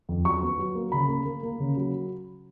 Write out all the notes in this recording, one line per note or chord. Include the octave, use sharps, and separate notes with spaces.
F2
F#3 C#6
B3
F#3
A#3
C#3 B5
A#3
A#3
A#3
C#3
F#3